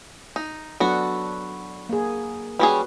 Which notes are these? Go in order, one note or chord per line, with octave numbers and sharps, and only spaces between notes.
D#4
F#3 B3 D4 F#4 A4
A#3 G#4
G3 C#4 F#4 G#4 B4